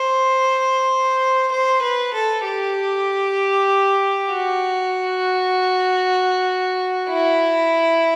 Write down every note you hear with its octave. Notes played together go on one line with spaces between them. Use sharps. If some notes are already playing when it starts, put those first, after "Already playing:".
Already playing: C5
C5
B4
A4
G4
F#4
E4